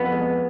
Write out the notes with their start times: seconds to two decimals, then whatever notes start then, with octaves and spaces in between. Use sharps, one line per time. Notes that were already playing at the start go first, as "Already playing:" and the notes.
Already playing: F2 B3
0.12 G#3